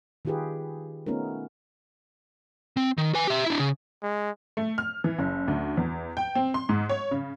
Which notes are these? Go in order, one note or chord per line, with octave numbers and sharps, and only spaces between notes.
D#3 D#4 F4 G4 G#4 B4
A3 B3 C#4 D#4 F4 A#4
C4
D#3
B4 G#5
G4 E5
D4 E4
C#3
G#3
A3
F6
E3
F#1
D2
E2
G5
C4
C6
G#2
C#5
C#3